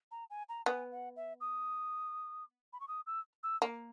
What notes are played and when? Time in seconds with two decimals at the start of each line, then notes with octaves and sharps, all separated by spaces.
0.11 A#5
0.30 G#5
0.49 A#5
0.66 B3 G#5
0.92 F#5
1.16 E5
1.40 D#6
2.73 B5
2.80 C#6
2.88 D#6
3.06 E6
3.43 E6
3.62 A#3